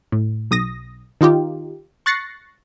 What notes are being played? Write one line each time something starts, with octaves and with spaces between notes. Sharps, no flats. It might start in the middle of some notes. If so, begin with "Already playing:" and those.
A2
B1 D#6 A#6
D#3 D#4 F4 G4
C#6 F#6 A6 A#6 C7 C#7